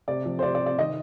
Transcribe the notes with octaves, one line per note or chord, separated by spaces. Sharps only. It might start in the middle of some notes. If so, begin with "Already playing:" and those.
C3 D5
F3
C5
C3 D5
D5
C3
D5
D#3 D#5